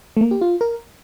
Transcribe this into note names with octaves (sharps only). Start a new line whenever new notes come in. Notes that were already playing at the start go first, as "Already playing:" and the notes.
A3
A#3
G4
F4
A#4